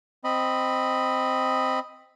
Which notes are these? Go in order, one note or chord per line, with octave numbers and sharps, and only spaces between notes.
C4 D#5 B5